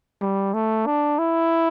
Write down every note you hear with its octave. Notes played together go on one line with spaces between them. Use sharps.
G3
A3
D4
E4